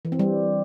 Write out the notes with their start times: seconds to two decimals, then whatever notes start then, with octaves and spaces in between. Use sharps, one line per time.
0.05 E3
0.12 C4
0.19 G3